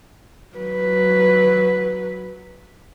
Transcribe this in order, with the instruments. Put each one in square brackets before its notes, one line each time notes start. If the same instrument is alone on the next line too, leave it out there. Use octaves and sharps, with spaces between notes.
[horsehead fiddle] F#3 B4